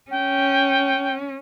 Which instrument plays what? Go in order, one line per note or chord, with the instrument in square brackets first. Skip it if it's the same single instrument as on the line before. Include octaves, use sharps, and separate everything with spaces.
[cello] C#4 [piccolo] G5